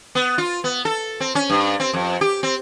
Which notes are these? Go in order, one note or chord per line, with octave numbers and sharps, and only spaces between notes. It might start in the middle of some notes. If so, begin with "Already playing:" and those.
B3
F4
B3
A4
C4
C#4
G2
C4
F2
G4
C4